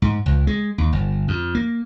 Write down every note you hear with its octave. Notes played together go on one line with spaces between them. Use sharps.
G#2
C#2
G#3
D#2
G1
F2
A#3